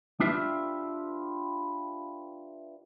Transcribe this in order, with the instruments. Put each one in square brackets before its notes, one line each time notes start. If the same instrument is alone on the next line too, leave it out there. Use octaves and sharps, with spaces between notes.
[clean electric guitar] D4 F4 G4 B4 E5